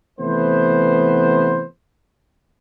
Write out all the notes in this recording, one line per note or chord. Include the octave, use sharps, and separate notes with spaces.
C3 E3 A3 B3 B4 C5